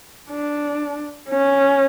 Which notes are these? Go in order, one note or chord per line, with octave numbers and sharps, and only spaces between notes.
D4
C#4